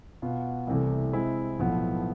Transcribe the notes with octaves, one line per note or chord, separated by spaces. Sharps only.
B2 B3 F4
C2 C3 E3 A3
C3 G#3 C4 E4
B1 A2 F3 B3